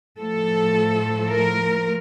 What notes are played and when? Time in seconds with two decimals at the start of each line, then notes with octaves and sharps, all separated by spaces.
0.19 A2 F3 A3 A4
1.30 A#4